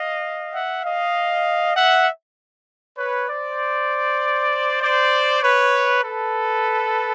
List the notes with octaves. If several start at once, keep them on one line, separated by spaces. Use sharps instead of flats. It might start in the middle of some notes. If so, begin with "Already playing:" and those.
Already playing: D#5 F5
E5 F#5
D#5 F5
E5 F#5
B4 C#5
C5 D5
C5 D5
B4 C#5
A4 B4